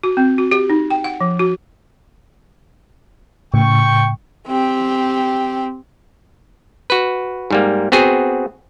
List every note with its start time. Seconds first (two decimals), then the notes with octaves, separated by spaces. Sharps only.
0.03 F#4
0.17 C4
0.38 F#4
0.51 G4
0.70 D#4
0.90 G5
1.04 F#5
1.21 F3
1.39 F#4
3.54 A2 C#3 G5 C#6
4.47 C4 G4
6.90 F#4 B4
7.51 G#2 G3 A#3
7.92 B3 C4 F#4 G#4